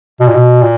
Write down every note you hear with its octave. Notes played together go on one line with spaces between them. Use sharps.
B2
A#2
B2
A#2